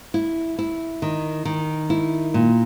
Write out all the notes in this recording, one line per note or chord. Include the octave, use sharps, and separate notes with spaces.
E4
E4
D#3
D#3
E4
A#2